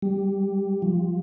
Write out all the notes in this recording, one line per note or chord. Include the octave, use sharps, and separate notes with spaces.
G3
F3